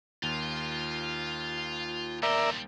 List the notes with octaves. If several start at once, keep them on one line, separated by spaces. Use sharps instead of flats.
D#2 F4
G3 A#4 D5 E5 C6